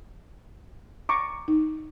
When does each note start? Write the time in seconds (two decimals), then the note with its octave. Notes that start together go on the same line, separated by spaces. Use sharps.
1.09 A#5 C#6 D6
1.48 D#4